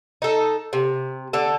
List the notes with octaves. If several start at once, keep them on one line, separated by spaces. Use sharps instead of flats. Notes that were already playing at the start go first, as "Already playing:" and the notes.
D#4 A4
C3
D3 A4